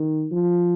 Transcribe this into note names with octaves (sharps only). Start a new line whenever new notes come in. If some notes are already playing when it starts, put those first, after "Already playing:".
Already playing: D#3
F3